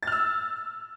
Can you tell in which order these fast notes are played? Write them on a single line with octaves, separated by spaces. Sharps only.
A6 F6 E6